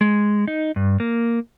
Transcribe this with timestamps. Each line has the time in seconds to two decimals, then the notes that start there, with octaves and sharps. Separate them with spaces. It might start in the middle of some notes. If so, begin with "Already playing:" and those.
0.01 G#3
0.48 D#4
0.76 G2
1.00 A#3